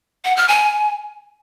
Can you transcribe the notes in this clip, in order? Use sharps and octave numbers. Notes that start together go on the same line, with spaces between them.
F#5
F6
G#5